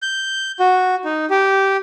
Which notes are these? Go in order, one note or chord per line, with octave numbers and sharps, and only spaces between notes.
G6
F#4
D#4
G4